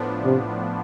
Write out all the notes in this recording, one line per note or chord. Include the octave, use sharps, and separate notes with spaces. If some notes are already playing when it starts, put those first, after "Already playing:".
Already playing: A2 F3 B3 D4
C3